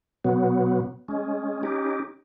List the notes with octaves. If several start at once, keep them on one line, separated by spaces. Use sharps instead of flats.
B2 F#3 B3
G#3 C#4
C#4 D#4 G4